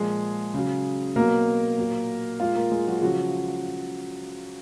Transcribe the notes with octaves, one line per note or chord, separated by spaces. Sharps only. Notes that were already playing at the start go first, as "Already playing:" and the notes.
Already playing: A#2 F3 G#3 G#4
C#3 F#3
B2 F#3 A#3 A#4
A#2 F#3
A#2 G#3 F4 F5
A#3 A#4
G#3 G#4
F#3 F#4
G#4
C#3 F3 F#3 F#4